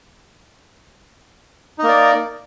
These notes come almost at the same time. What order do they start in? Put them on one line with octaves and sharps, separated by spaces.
D#4 A#3 D5